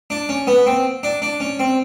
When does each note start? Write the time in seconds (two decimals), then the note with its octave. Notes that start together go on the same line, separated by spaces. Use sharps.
0.10 D4
0.29 C#4
0.47 B3
0.66 C4
1.03 D4
1.22 D4
1.40 C#4
1.59 C4